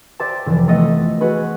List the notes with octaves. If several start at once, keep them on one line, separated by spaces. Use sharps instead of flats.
G4 C5 D5 E5 A5
F1 E3
A3 B3 D#5 E5
F#4 G#4 B4 D#5